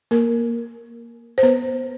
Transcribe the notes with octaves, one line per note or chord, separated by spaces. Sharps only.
A#3 A#4
C5
B3 B4